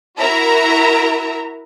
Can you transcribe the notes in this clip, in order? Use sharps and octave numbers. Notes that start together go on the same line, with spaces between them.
E4 F#4 A#4 E5 A#5